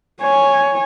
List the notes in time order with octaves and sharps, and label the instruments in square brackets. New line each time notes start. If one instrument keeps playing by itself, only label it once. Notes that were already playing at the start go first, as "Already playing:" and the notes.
[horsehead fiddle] C#5 G#5